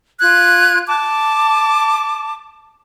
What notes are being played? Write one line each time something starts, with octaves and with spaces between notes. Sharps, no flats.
F4 F#6 G#6
A5 D6